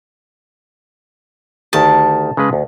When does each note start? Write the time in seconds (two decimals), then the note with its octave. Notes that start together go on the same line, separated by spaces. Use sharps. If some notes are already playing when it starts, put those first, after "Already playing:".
1.73 D2 D#3 G4 A5
2.37 C#3 G#3 B4
2.53 D2